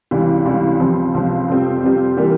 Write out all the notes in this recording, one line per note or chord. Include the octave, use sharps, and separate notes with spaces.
C#2 C3 E3 G3
C#2 C3 E3 G3
C#2 C3 F3 C4
C#2 C3 F3 C4
F2 C3 G3 C4 F4
F2 C3 G3 C4 F4
E3 G3 A#3